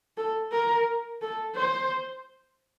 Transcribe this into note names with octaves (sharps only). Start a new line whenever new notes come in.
A4
A#4
A4
C5